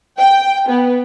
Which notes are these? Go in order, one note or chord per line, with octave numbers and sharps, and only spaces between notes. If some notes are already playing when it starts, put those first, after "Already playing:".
G5
B3